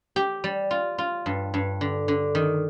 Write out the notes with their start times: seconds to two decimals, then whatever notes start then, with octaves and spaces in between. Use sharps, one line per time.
0.16 G4
0.44 G3
0.71 F4
0.98 F4
1.26 G2
1.54 G2
1.81 D3
2.08 D3
2.35 D#3